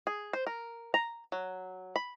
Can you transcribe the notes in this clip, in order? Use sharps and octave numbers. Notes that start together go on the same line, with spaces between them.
G#4
C5
A#4
A#5
F#3
B5